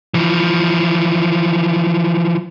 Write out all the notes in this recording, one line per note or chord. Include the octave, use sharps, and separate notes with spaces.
E3 F3